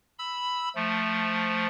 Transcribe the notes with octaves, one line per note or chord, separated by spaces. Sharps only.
B5 E6
F3 A3